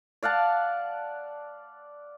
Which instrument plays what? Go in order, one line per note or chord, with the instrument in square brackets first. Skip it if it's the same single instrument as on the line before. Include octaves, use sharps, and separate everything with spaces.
[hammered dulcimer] D5 F5 F#5 A5